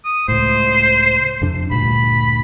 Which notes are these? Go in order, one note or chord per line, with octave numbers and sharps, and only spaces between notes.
D#6
C#2 A2 C5
F2 C3 D4
D2 G2 A#2 B5